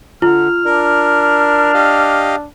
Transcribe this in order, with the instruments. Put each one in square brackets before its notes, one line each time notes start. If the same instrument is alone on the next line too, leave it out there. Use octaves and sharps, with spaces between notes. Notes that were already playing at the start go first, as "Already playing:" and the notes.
[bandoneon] D3 [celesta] F4 [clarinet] F6
[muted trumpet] D4 [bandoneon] A#4
[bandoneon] G4 D#5 F5